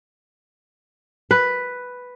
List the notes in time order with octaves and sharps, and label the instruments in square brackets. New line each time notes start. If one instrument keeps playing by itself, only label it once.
[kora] B4